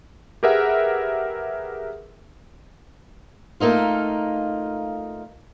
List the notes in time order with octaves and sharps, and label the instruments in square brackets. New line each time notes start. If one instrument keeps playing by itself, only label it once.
[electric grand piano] G4 G#4 A#4 B4 E5 F#5
[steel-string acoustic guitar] A3 A#3 D#4 F4